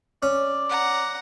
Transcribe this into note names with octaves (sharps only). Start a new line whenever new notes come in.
C#4 D5
F#5 A#5